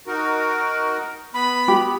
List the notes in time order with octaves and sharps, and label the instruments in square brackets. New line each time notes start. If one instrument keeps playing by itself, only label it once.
[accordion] D#4 F#4 A#4
[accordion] B3 [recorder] B5
[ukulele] G4